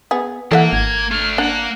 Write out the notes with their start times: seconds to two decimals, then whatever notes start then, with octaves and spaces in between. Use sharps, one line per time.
0.11 B3 G#4
0.52 E3 A#3 A4 E5 F#5
0.73 G#1 G#6
1.12 A3 D4 F6
1.38 A#3 D4 F#5